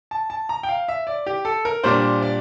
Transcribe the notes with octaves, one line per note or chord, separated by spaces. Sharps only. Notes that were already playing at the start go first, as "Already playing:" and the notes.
A5
A5
A#5
G5
F5
E5
D5
G4
A4
A#4
A#2 G3 D4 C5
D5